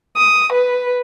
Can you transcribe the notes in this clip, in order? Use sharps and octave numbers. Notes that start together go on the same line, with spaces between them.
D#6
B4